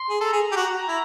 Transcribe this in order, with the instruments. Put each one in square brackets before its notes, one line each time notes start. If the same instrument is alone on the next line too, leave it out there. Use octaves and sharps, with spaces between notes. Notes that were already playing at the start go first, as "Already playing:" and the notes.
Already playing: [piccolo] C6
[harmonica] G#4
[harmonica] A4 [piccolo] A#5
[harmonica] G#4
G4
F#4
E4